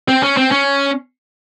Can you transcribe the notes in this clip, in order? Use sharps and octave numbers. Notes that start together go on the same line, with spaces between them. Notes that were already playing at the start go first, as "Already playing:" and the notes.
C4
C#4
C4
C#4